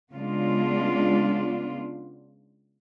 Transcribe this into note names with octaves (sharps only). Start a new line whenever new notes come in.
C#3 G#3 B3 D4 F4